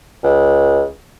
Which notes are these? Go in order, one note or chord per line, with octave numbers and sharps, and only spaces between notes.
C#2